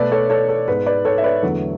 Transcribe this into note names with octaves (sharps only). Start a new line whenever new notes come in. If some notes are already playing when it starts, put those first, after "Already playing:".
Already playing: B2 A3 B4 D5
A4 C#5
A4 C#5
A4
G#2 G#3 B3 B4
B4 D5
A4 C#5
E5
B4 D5
E2 D3 F#3 A3